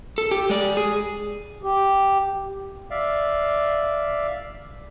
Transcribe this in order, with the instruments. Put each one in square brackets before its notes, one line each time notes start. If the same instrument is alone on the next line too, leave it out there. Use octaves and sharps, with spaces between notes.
[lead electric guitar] A4
G4
G#3 D5
G#4
[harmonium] G4
[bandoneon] D5 E5 F5